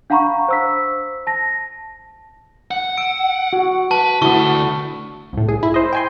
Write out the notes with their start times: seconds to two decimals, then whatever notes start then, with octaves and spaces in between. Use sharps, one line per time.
0.10 D4 F5 F#5 A#5 B5 C#6
0.48 C5 E6 B6
1.27 A5 A#6
2.71 F#5
2.98 E6 D7
3.53 F#4
3.91 B4 A5
4.22 D3 A3 E4 F#4 C#6 D#6
5.33 C2 A2
5.49 G#4
5.63 E4
5.74 C5 D#5
5.93 G5 G#5 C6